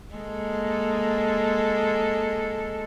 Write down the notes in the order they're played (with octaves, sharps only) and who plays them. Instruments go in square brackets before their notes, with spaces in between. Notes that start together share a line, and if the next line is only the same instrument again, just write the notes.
[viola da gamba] G#3 A#3 A4